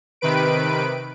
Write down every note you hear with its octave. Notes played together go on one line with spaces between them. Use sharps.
C3 D#3 B4 D7